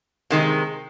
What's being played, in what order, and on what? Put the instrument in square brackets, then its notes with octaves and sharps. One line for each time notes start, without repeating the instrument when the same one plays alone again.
[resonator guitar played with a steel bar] C3 D#3 G#3